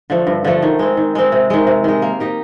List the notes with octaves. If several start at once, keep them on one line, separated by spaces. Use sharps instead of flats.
D3 F3 A3
G2
D3 F3 A3
D#3
G#3 C4
D#3
G#3 C4
C3
D#3 G#3
C3
D#3 G#3
A#3
D#4 G4